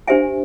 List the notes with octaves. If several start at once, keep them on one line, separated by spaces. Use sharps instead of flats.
D4 G4 C5 E5 G#5